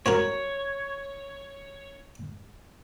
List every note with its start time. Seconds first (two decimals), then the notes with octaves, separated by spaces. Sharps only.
0.06 C4 F#4 A#4 C#5